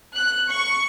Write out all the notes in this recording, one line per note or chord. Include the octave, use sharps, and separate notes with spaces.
F#6
C#6